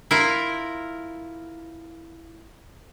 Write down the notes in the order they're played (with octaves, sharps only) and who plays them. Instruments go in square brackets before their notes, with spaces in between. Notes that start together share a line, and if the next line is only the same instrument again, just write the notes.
[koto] E4 F4 A#4 A#5